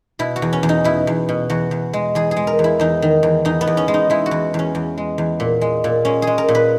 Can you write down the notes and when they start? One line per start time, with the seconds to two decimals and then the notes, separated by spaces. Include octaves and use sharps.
0.19 B2 E4
0.36 F#4
0.42 E2
0.53 C#4
0.63 E2
0.69 D#4
0.84 B2 E4
1.07 E2
1.29 B2
1.50 E2 F#4
1.71 E2
1.93 G#3
2.15 E2 G#4
2.31 G#4
2.36 G#3
2.47 A#4
2.59 E2
2.64 E4
2.80 E2 D#4
3.02 D#3
3.23 E2
3.45 E2 D#4
3.61 B3
3.67 E2
3.77 C#4
3.88 G#3
3.94 D#4
4.10 G#3 E4
4.26 F#4
4.31 E2
4.54 E2 C#4
4.75 E2
4.98 G#3
5.18 E2
5.40 A#2
5.61 G#3
5.84 A#2
6.05 G#3 C#4
6.22 G#4
6.27 G#3
6.38 A#4
6.48 A#2
6.55 B4